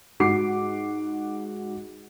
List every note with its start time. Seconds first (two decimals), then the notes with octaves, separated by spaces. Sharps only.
0.20 G#2 F#4 F#5 D6 C7